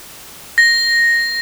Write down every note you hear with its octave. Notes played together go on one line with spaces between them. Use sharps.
A#6